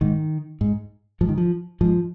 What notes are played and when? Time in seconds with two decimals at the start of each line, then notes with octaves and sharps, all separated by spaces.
0.01 G#2 D#3
0.61 G#2
1.21 G#2 F3
1.29 D#3
1.38 F3
1.81 G#2 F3